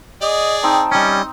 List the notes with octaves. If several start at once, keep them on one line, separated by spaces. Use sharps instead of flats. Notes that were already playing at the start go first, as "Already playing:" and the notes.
G#4 D5 D#5
C4 D#4 A5
G3 C#4 D#5